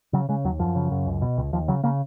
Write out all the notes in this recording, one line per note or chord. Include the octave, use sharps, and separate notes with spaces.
C#3 F#3
C#3 G#3
D#2 F#3
F#2 F3
C#3
F#2
C#2
B2
C#2
D#2 F3
C#3 F#3
C#3 A#3